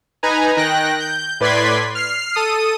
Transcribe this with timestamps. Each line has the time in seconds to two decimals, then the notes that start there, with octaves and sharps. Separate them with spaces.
0.23 D#4 B4 G#5 A#5
0.57 D#3 G5 F#6 A#6
1.00 G6
1.40 A2 B4 D5 C6 G#6 B6
1.95 F6 C7
2.35 A4 D#6 D#7